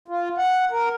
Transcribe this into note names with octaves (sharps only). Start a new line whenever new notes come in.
F4
F#5
A#4